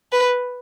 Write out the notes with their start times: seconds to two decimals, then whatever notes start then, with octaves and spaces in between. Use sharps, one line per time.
0.12 B4